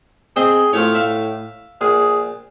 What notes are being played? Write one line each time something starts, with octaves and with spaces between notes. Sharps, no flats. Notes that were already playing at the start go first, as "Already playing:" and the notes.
C4 G#4 C5 D#5
A2 F3 A3 C#5
E5 F5
A#1 G#4